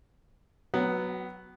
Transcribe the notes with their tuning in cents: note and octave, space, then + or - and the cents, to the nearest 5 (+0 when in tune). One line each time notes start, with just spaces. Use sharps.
F#3 +0 B3 +0 F#5 +40